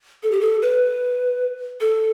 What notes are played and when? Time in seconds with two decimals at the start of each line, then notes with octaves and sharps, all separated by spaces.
0.23 A4
0.31 G4
0.41 A4
0.62 B4
1.80 A4